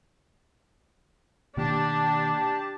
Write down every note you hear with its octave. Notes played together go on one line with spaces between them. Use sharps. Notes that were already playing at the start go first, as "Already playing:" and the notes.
B2 D#3 A#3 D4 G4 A5